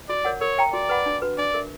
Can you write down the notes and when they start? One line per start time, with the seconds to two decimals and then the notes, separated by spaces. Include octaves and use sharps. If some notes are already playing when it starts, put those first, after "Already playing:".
0.09 F#4 D5
0.25 A#4 C#5 F#5
0.41 A#4 C#5
0.57 E5 G5 A#5
0.73 F#4 D5
0.89 B4 F#5 B5
1.06 D4
1.22 F#4 B4
1.38 D4 D5
1.54 A#4 E5